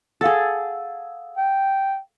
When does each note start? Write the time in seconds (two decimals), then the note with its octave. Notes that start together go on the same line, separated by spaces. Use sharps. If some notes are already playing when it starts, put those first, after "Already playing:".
0.21 G#4 A4 F5 F#5 E6
1.37 G5